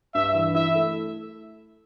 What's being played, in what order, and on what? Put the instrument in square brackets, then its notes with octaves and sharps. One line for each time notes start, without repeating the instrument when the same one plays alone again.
[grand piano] G2 [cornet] E5
[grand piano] E3
[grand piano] E4 [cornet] E5
[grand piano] A3